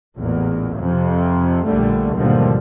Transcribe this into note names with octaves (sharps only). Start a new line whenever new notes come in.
A1 E2 A#2
F2 C3 F3
A#1 D3 G3 A3
D#2 G#2 B2 D3 F3 G3